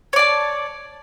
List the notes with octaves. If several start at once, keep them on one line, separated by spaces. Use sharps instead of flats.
C#5 D5 A5